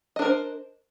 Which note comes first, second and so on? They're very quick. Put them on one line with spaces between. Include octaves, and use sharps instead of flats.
D#5 D4 A#4 C5